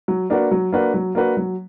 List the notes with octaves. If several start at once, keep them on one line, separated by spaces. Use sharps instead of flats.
F#3
A#3 D4 F#4 B4
F#3
A#3 D4 F#4 B4
F#3
A#3 D4 F#4 B4
F#3